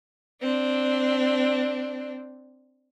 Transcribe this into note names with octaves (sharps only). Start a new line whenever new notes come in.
C4 D4